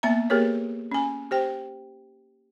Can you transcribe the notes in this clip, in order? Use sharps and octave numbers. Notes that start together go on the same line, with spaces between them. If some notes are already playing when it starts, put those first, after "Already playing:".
A#3 B3 E5 A#5
A#3 G4 G#4 A#4 B4 C#5
C#4 G#5
G4 C5 G5